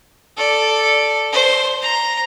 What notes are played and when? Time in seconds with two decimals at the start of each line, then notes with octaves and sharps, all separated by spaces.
0.37 A4 D5
1.33 C5
1.82 A#5